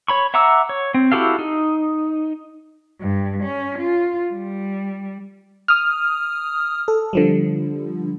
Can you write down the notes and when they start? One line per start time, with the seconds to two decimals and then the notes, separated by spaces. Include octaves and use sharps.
0.08 C#5 B5 C#6
0.34 E5 F#5 A#5 D6 E6
0.69 C#5
0.94 C4
1.12 E4 F#4 G4 A4 F5
1.39 D#4
3.00 G2
3.44 C#4
3.79 F4
4.32 G3
5.68 D#6 F6
6.88 A4
7.13 D3 F3 G3